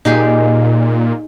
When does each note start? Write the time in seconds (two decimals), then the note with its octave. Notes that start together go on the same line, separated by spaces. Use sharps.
0.05 A#2 D#4 G4 G#4